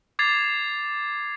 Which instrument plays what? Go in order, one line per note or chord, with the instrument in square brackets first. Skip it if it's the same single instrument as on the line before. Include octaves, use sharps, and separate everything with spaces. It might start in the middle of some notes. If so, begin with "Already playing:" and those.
[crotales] D6 G#6 A6 C7 F7